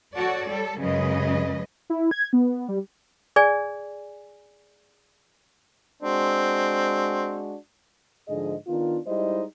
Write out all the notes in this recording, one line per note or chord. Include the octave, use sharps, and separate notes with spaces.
F#4 A4 C#5 D5
G3 A4
F#2 C#3 G#3 B4 D#5
E4
G#6
B3
G3
G#4 D5 G#5
G#3 C4 D4 F#4
G#2 D3 F3 G#4 D#5
D#3 B3 D4 F4
G3 G#3 D#4 E4 C5 D#5